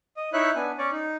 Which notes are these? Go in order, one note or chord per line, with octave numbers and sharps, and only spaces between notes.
D#5
D#4 E4 C#5 E5 F#6
B3 D4 G#5
C#4 C#5 D5
D#4